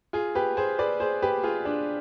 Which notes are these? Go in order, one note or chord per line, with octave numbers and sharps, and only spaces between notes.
F4 G#4
G4 B4
G#4 C5
B4 D5
G#4 C5
G4 B4
F4 G#4
D4